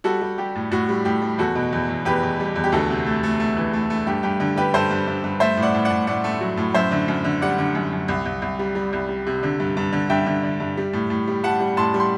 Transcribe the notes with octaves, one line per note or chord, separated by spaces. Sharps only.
G3 F#4 A4
G3
G3 G4
A2
A2 F#4
G3
A2 G4
G3
E2 F#4 A4
B2
E2
E2
E2 G4 B4
E2
G3
E2
G4
D2 F#4 A4
C3
A3
A3
A3
E3
A3
A3
G2 G4
G2 G4
D3
G3 G4 B4
G2 A4 C5
G2
G2
G2
A3 C5 E5
A2
D5 F#5
A2
D5 F#5
A2
A2 D5 F#5
A3
F#3
A2
F#2 C5 E5
D3
F#2
D3
G3 D5 F#5
D3
F#2
F#2
C2
C2
C2
G3
G3
C2
G3
C3
D3
G2
G2
D3
G2 E5 G5
D3
D3
G2
G3
A2
A2
G3
G3 F#5 A5
G3
A2 A5 C6
G3
C6